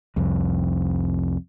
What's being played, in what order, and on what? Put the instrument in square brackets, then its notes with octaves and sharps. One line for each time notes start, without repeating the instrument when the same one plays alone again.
[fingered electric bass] C2 F2